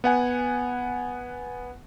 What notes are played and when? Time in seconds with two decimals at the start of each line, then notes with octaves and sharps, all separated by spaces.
0.04 B3 F#5 G#5